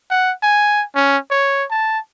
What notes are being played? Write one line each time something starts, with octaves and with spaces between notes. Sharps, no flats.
F#5
G#5
C#4
C#5
A5